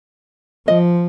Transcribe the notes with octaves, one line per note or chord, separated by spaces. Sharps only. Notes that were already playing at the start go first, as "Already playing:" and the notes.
F3 D#5